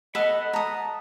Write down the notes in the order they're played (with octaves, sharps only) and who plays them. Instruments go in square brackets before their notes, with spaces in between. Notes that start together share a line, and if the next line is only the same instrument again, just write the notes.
[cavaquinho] A4 [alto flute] D#5 [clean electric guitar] F#5 B5
[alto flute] A5 [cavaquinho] A#5 D#6